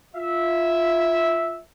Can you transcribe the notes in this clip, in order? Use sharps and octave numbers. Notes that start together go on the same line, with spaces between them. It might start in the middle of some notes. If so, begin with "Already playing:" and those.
F4 E5